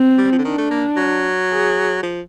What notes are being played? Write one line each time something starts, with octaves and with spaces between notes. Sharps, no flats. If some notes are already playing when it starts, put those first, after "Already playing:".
Already playing: C4
G3
F3
D3
D#3 D4
A3
A#3
F#3
G#4
F3